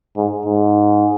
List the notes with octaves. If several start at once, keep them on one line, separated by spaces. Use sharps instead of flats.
G#2
G#2